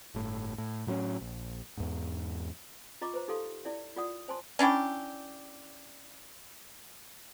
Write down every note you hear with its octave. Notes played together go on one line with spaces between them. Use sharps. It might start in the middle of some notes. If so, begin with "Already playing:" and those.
G1 A2
A2
A2 F#3 C4 C#4
A#1
E2 G#2
F4 D#5 A#5 C#6 D6
B4 C5 A#5
D#4 G4 A4 F5 C6
E4 D5 E5
F4 A#4 D5 F#5 D#6
C5 G#5 A5 C6
C#4 D4 E4 G4